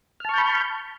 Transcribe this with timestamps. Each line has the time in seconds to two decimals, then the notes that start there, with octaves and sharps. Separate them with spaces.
0.20 F6
0.25 A5
0.29 C#6
0.34 G6
0.38 B5